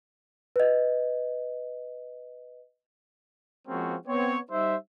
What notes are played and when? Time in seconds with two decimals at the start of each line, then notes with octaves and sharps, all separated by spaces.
0.56 B4 D#5
3.68 F3 G#3 A#3 C4 C#4 F#4
4.07 B3 C4 C#5
4.51 G3 D#4 C5 E5